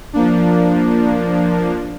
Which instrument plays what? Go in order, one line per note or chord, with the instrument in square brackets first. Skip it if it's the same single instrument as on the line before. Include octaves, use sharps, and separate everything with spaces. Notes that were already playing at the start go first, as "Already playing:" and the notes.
[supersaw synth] F3 A#3 D4